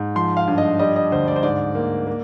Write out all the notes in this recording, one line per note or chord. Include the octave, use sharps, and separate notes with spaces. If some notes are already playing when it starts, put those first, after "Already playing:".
Already playing: G#2
F3 C6
F5
G2
D#5
G3 D#5
D#5
D2 C5
D5
C5
G#2 D5
A#3
A#3